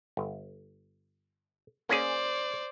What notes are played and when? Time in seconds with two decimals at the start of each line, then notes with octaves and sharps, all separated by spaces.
0.17 G1
1.89 A#3 C#4 G#4 C5 D5